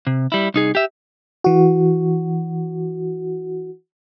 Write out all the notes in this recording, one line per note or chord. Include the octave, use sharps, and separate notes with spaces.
C3
G3 E4
C2 D#4 G#4
G4 E5
E3 F#4